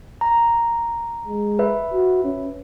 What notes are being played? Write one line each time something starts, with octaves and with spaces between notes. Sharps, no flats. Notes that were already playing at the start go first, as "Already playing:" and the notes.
A#5
G#3
B4 E5
F#4
C#4